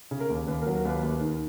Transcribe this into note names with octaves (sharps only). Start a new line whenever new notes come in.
C#3
A#4
D#2
D#2 B4
A#4
F#3
A#4
D#2 B4
D#2
D#3